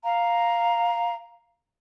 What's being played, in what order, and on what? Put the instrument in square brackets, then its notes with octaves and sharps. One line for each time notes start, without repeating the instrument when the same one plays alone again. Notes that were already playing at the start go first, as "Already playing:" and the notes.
[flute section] F5 A#5